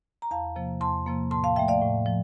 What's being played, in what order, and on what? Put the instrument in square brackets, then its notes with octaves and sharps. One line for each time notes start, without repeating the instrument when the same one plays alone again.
[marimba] A#5
E2 F5 A5
C3 F3 A#3
E2 A5 C6
C3 F3 A#3
A2 A5 C6
F5 A5
F3 A3 E5 G5
D5 F5
A2
F3